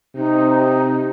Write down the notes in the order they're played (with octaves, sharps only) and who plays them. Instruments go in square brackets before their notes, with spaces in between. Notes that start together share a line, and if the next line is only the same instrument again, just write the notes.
[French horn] C3 [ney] D#4